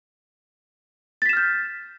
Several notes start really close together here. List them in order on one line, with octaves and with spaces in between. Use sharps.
A6 B6 E7 F6 G6